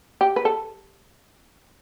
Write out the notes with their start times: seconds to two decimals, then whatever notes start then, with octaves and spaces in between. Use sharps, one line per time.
0.21 G4
0.36 B4
0.45 A4